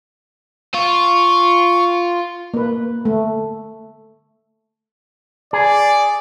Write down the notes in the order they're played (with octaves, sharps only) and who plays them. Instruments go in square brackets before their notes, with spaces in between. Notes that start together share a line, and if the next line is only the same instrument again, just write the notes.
[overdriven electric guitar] F4 [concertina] C#6
[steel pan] A#3 B4
A3
[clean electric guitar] G#4 [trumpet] D5